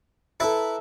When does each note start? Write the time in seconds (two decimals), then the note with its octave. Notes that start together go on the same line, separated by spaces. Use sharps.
0.40 E4 A4 B4 E5 A#5